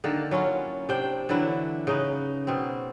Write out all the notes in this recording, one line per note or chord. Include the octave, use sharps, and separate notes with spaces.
D3 D#3 A#3 A4
F#3 C#4 E4 F4
C3 D4 C5 G5
D3 E3 F#3 E4
C#3 D#4 B4
B2 C4